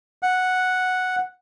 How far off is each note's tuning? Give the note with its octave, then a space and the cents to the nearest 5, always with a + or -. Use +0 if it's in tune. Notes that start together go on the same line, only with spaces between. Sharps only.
F#5 -5